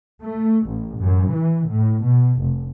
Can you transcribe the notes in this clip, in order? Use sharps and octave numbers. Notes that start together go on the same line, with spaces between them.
A3
A1
F#2
E3
A2
B2
F1